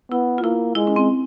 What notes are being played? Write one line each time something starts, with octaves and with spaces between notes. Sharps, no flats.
B3 E4
F4
A#3 E4
G#3 E4
C#4
C4